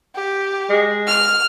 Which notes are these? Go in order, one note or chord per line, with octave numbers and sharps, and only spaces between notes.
G4
G#3
F6